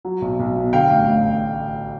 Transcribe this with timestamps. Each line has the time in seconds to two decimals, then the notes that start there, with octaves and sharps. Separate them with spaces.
0.05 F#3
0.22 B1
0.39 B1
0.56 B2
0.73 D3 F5 G5
0.90 A1
1.07 A1